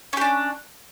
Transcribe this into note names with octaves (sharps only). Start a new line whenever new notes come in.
C#4 D4 G4